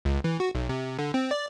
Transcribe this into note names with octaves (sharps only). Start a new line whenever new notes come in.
C#2
E3
F#4
B1
C3
D3
C4
D5